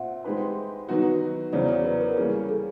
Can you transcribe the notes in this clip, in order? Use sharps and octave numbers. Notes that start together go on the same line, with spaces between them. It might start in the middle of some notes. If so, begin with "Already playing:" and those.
Already playing: A#2 C4 E5 F#5
G#3 C4 D#4 G4 B4
D#3 F#3 B3 D#4 F#4
E2 C#3 F#3 C5 D5
C#5
B4
A#4
E3 G3 A#3 C#4 G#4
A4